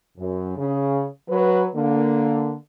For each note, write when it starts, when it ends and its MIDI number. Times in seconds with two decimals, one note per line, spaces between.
0.18 0.54 42
0.56 1.04 49
1.29 1.65 54
1.29 1.65 71
1.74 2.54 50
1.74 2.54 58